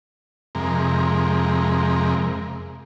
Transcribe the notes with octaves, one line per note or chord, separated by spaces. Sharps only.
F2 C3 G#3 A#4